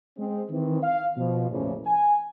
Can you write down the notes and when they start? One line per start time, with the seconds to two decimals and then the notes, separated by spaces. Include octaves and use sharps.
0.18 G#3 C4
0.51 D#3 E3 C4
0.83 F5
1.17 B2 F3
1.51 A1 E2 A#2 C#3 E3 F3
1.86 G#5